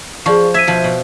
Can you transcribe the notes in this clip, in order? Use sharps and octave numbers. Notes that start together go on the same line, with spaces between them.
F3 G#4 D5 C#6
E5 G#6 B6 D#7
B2 F3
B2